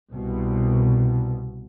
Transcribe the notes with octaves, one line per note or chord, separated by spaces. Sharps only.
C2 B2